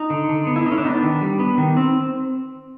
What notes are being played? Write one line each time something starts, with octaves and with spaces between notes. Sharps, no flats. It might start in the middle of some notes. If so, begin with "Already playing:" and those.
Already playing: D#4
D3
D3
B3
E4
D3 D#4
C#4
D4
B3 D#4
D4
D#3
G3
B3
D#3
C4